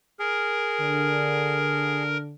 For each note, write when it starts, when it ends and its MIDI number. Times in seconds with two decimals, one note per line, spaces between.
0.19 2.03 68
0.19 2.18 70
0.79 2.34 50
0.79 2.34 62